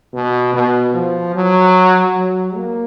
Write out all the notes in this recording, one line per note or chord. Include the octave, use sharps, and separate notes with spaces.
B2
B2
F3
F#3
F#3
A#3